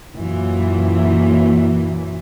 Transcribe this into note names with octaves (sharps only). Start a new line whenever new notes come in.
F#2 A#2 E3